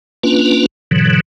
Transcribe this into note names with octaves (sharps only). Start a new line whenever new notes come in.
A#3 C#4 D4 F4 B4
G#2 B2 D3 E3 F#3